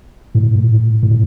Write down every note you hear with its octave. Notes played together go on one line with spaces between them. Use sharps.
A2
A2